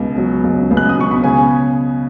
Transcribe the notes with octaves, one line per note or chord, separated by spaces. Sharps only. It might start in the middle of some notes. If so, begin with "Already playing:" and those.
Already playing: C#2 B2
F#3
C#2
C#2
F#6
D#6
B2 C#6
B5
C#3 G#5